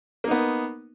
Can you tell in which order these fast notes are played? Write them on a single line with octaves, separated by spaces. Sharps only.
A#3 D#4 B3